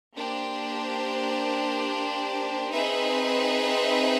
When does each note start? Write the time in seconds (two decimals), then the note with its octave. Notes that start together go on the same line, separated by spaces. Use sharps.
0.15 A#3 D4 G4 C5
2.72 C4 D#4 G#4 B4 E5